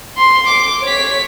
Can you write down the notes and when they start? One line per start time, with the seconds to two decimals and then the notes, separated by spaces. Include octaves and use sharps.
0.17 C6
0.47 D6
0.83 C#5 B6